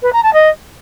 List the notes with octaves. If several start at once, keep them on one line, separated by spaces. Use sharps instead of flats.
B4
A#5
A5
D#5